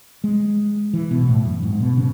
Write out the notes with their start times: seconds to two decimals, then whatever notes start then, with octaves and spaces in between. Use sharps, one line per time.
0.24 G#3
0.93 E3
1.11 B2
1.22 G#2
1.28 A2
1.45 F#2
1.63 G#2
1.80 B2
1.97 C#3